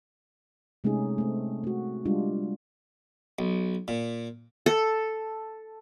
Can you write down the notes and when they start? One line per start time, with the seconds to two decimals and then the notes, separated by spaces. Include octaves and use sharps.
0.84 C3 G#3 A3 C#4 D#4 G#4
1.18 A3 C4
1.64 A3 F#4
2.05 G3 G#3 D4 F4
3.39 B1
3.88 A#2
4.66 A4